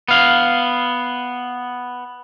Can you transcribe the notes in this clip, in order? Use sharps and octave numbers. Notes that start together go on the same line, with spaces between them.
B3 F5